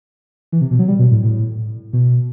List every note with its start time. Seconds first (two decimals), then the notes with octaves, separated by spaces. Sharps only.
0.52 E3
0.61 C3
0.71 B2
0.79 F#3
0.88 G3
0.99 B2
1.12 A2
1.23 A2
1.93 B2